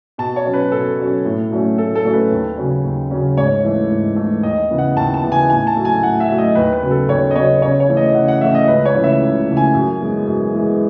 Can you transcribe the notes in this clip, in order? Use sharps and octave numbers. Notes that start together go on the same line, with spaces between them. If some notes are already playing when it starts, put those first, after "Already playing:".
B2 A5
C#5
F#3 C#4
B4
B2 A4
F#3 C#4
A2
F#3 A3 C#4
A2 A4
A4
F#3 A3 C#4
B4
D#2
C#3 F#3 C#4
D#2
C#3 F#3 C#4
G#2 C#5
E3 A3
G#2
E3 A3
D#2 D#5
C#3 E3 B3
F#5
D#2 A5
A5
C#3 E3 B3
G#5
A2 G#5
A5
F#3 A3
G#5
A2 F#5
E5
F#3 A3
D#5
D#2 B4
B4
C#3 F#3 B3
A4
D#2 C#5
D#5
C#3 F#3 B3 C#5
C#3 C#5
C#5
E3 A3 C#4
D#5
C#3 F#5
F#5
E3 A3 C#4 E5
D#5
C#2 B4
C#5
C#3 E3 A3
E5
C#2
C#3 E3 A3
G#5
F#2
E3 G#3 B3
F#2
E3 G#3 B3